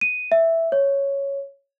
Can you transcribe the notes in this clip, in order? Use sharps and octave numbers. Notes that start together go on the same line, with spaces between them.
D#7
E5
C#5